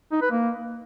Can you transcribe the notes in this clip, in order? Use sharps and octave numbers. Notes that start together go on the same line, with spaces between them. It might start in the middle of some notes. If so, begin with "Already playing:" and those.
D#4
B4
A#3